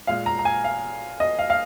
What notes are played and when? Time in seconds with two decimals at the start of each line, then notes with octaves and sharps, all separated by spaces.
0.07 A#2 G#3 F5
0.26 A#5
0.39 A#5
0.45 G#5
0.64 F5
1.20 D#5
1.39 F5
1.50 F5